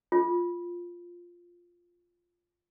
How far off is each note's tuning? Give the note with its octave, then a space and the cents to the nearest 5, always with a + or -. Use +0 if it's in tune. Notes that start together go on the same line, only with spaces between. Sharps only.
F4 +0